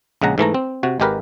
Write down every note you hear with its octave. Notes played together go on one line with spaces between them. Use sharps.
A#1 C#3 G#3 F#5 A#5
G#2 E3 A3 A#5
C4
C3 F#4
G#1 G#3 G4 A#4 B4